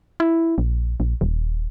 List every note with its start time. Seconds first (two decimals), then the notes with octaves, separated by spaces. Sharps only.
0.20 E4
0.58 A#1
1.00 A#1
1.21 D#1